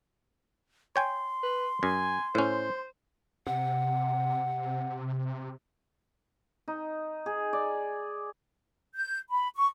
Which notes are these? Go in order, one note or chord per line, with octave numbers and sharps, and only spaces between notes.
C#5 G5 G#5 C6
B4
F#2 G#5
A2 C#4 C5
C3 F#5
D#4
G#4
D5
G6
B5
C#6